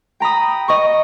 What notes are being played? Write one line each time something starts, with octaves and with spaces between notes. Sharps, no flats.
G5 A#5 B5 D#6
D#5 C#6